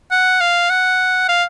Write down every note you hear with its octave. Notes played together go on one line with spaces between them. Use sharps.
F#5
F5
F#5
F5